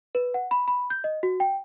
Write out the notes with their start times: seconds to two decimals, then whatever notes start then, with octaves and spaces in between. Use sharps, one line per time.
0.15 B4
0.34 F#5
0.51 B5
0.68 B5
0.90 G6
1.04 D#5
1.23 F#4
1.40 G5